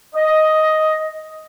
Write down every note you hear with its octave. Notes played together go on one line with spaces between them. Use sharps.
D#5